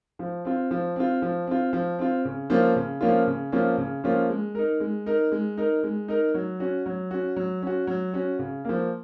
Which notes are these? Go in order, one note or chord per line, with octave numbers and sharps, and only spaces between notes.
F3
C4 F4
F3
C4 F4
F3
C4 F4
F3
C4 F4
C#3
F3 A#3 C#4 F4
C#3
F3 A#3 C#4 F4
C#3
F3 A#3 C#4 F4
C#3
F3 A#3 C#4 F4
G#3
D#4 A#4
G#3
D#4 A#4
G#3
D#4 A#4
G#3
D#4 A#4
F#3
C#4 F#4
F#3
C#4 F#4
F#3
C#4 F#4
F#3
C#4 F#4
C#3
F3 A#3